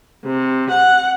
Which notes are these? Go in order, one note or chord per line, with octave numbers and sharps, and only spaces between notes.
C3
F#5